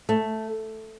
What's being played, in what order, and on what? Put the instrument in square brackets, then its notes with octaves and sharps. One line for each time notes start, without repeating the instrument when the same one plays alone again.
[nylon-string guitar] A3